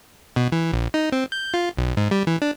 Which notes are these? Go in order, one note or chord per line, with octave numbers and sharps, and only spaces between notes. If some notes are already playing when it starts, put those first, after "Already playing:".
B2
E3
A#1
D#4
C4
G6
F4
B1
G#2
G3
E3
D4